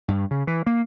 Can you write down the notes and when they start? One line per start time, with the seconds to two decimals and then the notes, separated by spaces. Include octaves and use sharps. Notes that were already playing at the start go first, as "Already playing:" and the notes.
0.08 G2
0.31 C#3
0.47 E3
0.66 A#3